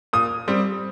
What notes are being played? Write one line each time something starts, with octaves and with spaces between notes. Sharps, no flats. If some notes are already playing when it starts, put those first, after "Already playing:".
A#2 D#6
G3 C4